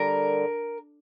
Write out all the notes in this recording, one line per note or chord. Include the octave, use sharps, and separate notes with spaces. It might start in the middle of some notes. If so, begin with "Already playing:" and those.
Already playing: D3 G3 A#4